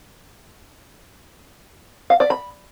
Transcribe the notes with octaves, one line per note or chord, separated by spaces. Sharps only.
F5
D5
B5